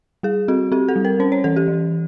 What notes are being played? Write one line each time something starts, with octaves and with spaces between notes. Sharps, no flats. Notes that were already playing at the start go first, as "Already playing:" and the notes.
G3 G#4
C4 F#4
C4 G4
A4
G3
A#4
C#4 C5
C#5
E3 A4
G4
E3